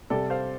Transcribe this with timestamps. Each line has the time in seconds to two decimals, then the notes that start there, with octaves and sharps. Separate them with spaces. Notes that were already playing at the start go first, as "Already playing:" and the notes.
0.10 C3 G3 A4 D5
0.30 C5 F5